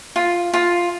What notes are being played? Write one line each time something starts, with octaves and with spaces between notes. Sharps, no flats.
F4
F4